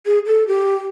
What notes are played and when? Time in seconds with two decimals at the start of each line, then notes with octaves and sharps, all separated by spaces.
0.06 G#4
0.26 A4
0.48 G4